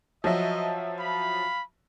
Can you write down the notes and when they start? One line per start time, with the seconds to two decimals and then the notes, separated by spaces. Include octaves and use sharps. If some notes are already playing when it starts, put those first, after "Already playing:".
0.24 F3 F#3 D#5 E5
0.99 F5 B5